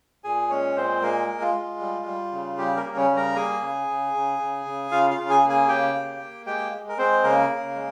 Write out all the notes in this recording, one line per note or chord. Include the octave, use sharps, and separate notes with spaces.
A#2 G#4 G#5
G#3 C#4 C#5
A#2 C4 C5
G#3 A#3 A#4
G#3
F4
G#3
G3
G3
C#3
G3 G4
A#3 A#4
C#3
C#4 C#5
G3
A#4 A#5
A#3 G#4 G#5
C#3
C#3
C#3
C#3
C#3
C#3 F4 F5
F4 F5
C#3
G#4 G#5
A#3
G#4 G#5
C#3 G4 G5
A#3
A#3
G#3 G4 G5
G#3
A#4
G#3 C4 C5
C#3 A#3 A#4
C#3
G#3